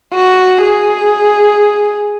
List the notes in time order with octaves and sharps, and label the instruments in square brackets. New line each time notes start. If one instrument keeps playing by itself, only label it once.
[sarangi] F#4
G#4